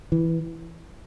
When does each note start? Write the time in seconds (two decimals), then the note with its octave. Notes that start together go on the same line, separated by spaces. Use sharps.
0.12 E3